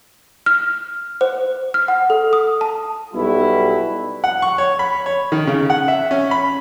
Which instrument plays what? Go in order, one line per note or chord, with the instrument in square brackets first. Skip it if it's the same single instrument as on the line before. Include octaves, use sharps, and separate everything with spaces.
[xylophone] F6
C5
F6
F#5
A4
D#6
A5
[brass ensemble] B1 B2 G3 E4
[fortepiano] F#5
C#6
C#5
B5
C#5
D#3
C#3
F#5
E5
C#4
B5